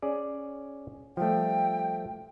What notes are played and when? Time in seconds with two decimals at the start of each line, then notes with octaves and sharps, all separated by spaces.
0.02 C#4 G#4 D5
1.17 F3 G3 A3 G5